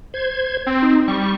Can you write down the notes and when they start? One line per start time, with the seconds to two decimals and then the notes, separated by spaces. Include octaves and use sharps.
0.14 C5 G#6
0.67 C4
0.82 D#4
1.08 G3 C#6